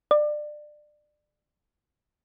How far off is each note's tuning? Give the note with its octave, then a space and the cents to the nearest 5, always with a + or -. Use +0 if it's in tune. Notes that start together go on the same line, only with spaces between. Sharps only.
D5 +25